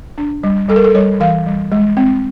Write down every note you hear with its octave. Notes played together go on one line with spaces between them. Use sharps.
D4
G3
G3 A4
A#4
A4
G3 C#5
E3 F5
G3
G#3
C4